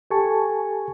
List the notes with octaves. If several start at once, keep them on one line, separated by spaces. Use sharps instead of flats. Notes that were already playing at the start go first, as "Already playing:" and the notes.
G4 A4 G#5 A5 C#6